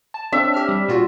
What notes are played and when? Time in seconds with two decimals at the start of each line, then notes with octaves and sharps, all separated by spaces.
0.14 A5
0.32 C4 D4 E5
0.54 G4 F6
0.69 G3
0.88 A#2 F4 F#4